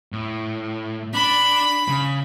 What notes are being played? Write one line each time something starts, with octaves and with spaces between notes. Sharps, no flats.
A2
D4 B5
C#3